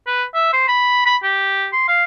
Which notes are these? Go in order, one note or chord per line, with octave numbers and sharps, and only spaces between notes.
B4
E5
C5
B5
B5
G4
C6
F5